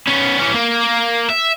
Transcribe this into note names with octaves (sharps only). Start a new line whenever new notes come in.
B3 C#4
E3 C#4
A#3
E5